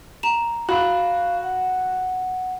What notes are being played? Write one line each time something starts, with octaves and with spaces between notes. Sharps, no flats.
A#5 E7
F#4 F5 B5
F#5